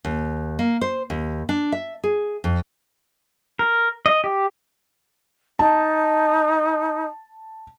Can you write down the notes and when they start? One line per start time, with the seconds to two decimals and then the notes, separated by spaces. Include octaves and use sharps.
0.05 D#2
0.59 A#3
0.81 C5
1.10 D#2
1.49 D4
1.72 E5
2.04 G#4
2.44 F2
3.59 A#4
4.06 D#5
4.24 G4
5.59 D#4 A5